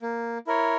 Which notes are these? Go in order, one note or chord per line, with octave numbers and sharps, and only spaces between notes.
A#3
E4 A#4 C#5